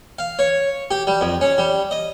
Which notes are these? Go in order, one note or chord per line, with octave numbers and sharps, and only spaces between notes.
F5
C#5
G4
G3
F2
C#4
G3
D#5